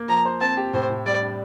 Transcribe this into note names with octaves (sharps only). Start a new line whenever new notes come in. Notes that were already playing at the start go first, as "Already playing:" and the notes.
Already playing: A#3
F3 A#5
C5
C4 A5
G4
A2 C5
A2
G3 D5
D4